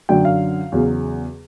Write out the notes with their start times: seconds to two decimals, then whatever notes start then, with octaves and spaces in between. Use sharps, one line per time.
0.09 F#2 D3 F#3 G5
0.25 F5
0.72 E2 C#3 F#3